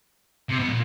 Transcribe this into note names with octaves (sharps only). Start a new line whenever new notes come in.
C3
B2
A#2